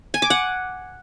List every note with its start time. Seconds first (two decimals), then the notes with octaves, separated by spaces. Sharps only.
0.14 G#5
0.22 D6
0.30 F#5